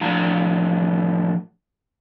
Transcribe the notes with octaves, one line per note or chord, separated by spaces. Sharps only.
A2 F3 D4 A#5